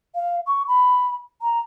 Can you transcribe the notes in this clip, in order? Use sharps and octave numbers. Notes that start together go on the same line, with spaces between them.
F5
C#6
B5
A#5